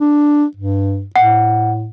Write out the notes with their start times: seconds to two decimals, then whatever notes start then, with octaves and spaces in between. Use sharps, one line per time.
0.01 D4
0.57 G2
1.16 A2 F#5